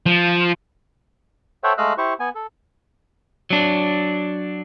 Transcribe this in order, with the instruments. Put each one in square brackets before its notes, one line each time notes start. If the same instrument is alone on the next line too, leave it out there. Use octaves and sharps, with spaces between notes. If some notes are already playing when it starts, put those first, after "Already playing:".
[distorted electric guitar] F3
[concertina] A4 C5 C#5 E5 F#5 G5
G#3 A3 D#5 F5 E6 F#6
E4 G4 C5 C#6
B3 G#5
A4
[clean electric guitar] F#3 D4